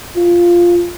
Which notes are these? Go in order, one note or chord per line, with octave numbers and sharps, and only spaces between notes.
F4